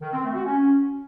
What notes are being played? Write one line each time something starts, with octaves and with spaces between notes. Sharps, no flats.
D#3
C4
A3
F#4
C#4